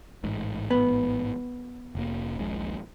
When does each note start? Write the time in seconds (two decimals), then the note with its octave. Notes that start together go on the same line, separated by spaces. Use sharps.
0.24 A1 G#2
0.71 B3
1.95 F1 A#3
2.39 D#1 A#1 G#3